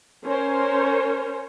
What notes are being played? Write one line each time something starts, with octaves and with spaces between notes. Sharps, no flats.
C#4 A#4 C5 C#5